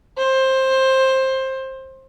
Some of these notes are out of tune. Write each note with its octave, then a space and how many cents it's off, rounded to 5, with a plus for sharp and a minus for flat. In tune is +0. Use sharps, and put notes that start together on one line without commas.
C5 +15